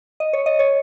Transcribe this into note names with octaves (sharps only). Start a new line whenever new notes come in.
D#5
C#5
D#5
C#5